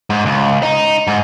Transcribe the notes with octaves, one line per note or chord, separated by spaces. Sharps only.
G#2
C#2
D#4
G#2